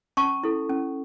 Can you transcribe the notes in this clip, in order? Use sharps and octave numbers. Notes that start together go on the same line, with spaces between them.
C#4 A5 C#6
E4 A4
C#4